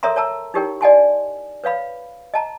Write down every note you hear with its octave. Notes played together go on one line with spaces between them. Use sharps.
A4 A#4 C#5 E5 A#5 C6
C#5 A5 A#5 E6
D#4 E4 G4 A#4 C#5 G5
D5 D#5 F#5 G#5 A5 C6
B4 C#5 F5 B5
D#5 A5 A#5